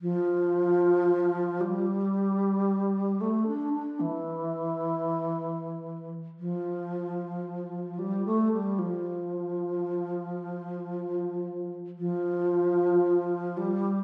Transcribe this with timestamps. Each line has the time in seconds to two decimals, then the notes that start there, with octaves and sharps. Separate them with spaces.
0.02 F3
1.61 G3
3.21 A3
3.47 D4
3.74 D4
4.00 E3
6.39 F3
7.99 G3
8.26 A3
8.52 G3
8.79 F3
11.98 F3
13.57 G3